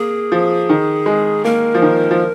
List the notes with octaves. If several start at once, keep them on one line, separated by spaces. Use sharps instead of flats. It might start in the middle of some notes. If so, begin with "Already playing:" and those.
Already playing: A#3 G#4
F3
D#3
G#3
A#3 A#4
F3
D#3
F3